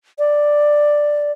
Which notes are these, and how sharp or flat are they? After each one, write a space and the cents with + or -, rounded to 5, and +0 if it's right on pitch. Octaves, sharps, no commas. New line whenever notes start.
D5 +5